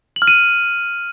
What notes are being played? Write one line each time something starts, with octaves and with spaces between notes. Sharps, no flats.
F#7
F6
D#7